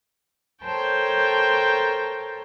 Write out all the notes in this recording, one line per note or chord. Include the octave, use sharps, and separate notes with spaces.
A4 A#4 C5 C#5 G5 A5